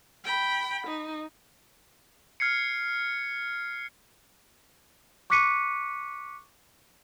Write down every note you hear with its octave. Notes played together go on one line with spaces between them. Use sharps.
G5 B5
D#4
F6 G#6 C7 C#7
C#6 D6 F#6 B6 C#7 D#7